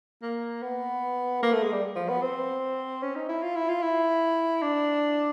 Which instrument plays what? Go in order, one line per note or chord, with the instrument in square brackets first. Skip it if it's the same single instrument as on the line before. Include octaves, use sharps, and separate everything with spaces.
[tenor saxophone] A#3
B3
A#3
A3
G#3
G3
F3
B3
C4
C#4
D#4
E4
F4
E4
F4
E4
D4